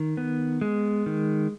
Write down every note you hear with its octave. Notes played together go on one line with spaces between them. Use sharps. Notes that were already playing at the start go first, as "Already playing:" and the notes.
Already playing: D#3
B3
G#3
D#3